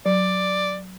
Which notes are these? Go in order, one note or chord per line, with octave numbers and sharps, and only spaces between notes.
F#3 D5